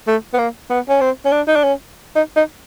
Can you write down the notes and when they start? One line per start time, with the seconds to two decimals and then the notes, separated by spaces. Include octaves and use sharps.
0.07 A3
0.33 B3
0.39 A#3
0.70 B3
0.89 C#4
1.01 C4
1.25 C#4
1.32 D4
1.48 D#4
1.56 D4
1.64 C#4
2.16 D#4
2.37 D#4